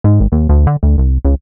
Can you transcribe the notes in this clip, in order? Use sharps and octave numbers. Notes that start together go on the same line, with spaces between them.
G#2
G#1
D#2
D2
D3
D2
C2
C#2